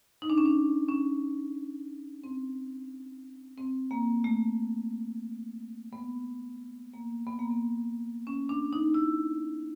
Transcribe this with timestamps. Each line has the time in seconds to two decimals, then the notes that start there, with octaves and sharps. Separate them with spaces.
0.22 D#4
0.30 D4
0.38 C#4
0.46 D4
0.89 C#4
2.24 C4
3.58 C4
3.91 A#3
4.24 A3
5.93 B3
6.94 A#3
7.27 B3
7.39 A#3
7.50 B3
8.27 C#4
8.49 D4
8.73 D#4
8.94 E4